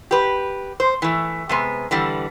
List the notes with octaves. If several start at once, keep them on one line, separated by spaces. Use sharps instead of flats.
G4 B4
C5
E3 A3
C3 G#3 B3
D3 E3 G3